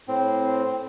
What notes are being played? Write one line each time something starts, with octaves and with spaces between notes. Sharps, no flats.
A2 C4